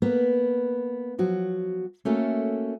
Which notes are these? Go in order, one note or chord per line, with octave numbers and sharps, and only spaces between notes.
A#3 B3 B4
F3 F#3 F#4
A3 A#3 C#4 F#4 A4